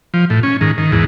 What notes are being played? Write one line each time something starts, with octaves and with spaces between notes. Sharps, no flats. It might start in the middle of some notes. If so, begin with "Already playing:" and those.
F3
A2
C#4
G#2 D#3
D#3
E2 G#2